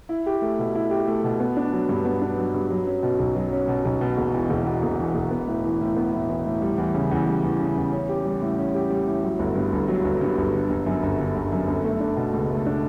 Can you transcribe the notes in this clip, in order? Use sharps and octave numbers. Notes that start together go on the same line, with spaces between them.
E4
G4
A3
B2
E4
G4
A3
B2
B3
D4
F#3
G2
B3
D4
F#3
G2
F#3
C#4
B2
B1
F#3
C#4
B2
B1
B2
E1
E2
E1
B2
E1
E2
E1
B3
A2
E3
A2
B3
A2
E3
A2
G3
E2
C#3
E2
G3
E2
C#3
E2
C#4
G4
G3
A2
C#4
G4
G3
A2
F#3
G1
G2
G1
F#3
G1
G2
G1
D3
G1
F#2
G1
D3
G1
F#2
G1
A3
D4
B2
C#2
A3
D4